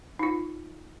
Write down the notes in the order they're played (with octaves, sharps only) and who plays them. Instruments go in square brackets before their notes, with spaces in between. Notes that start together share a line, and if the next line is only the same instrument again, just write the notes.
[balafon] D#4 F4